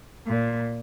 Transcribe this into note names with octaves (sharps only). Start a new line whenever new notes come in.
A#2